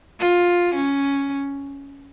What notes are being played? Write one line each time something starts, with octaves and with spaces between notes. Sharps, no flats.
F4
C#4